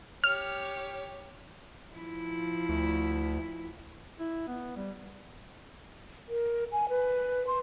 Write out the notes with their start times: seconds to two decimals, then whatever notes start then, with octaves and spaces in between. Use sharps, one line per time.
0.24 G4 C#5 F6
1.94 F3 E4
2.69 D2
4.20 E4
4.48 B3
4.76 G3
6.29 A#4
6.72 G#5
6.89 B4
7.47 C6